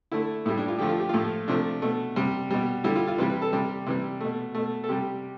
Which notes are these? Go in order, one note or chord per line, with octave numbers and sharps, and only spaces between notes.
D3 A3 E4
A2 G3 E4
D4
F4
D3 F3 A3 G4
F4
G4
A2 F3 A3 F4
C3 F3 A3 D4
B2 A3
C3 G3
B2 G3
D3 G3 E4
F4
F4
C3 E3 G3 B4
B4
A4
C3 G3 G4
C3 E3 G3
B2 A3
B2 A3
A4
C3 G3 G4